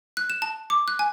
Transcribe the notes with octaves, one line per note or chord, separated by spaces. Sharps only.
F#6
E7
A5
D6
F#6
G#5